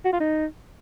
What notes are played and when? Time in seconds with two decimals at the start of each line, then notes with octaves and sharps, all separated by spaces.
0.05 F#4
0.13 F4
0.20 D#4